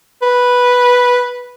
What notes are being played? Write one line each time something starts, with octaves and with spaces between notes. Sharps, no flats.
B4